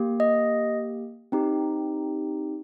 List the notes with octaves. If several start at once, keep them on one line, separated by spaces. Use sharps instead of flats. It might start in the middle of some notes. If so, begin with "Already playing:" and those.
Already playing: A#3 G4
D#5
C4 D#4 G4